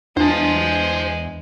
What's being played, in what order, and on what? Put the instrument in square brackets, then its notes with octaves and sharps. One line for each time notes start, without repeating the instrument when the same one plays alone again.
[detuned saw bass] E2 [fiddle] G#3 [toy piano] D4 [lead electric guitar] C5 A5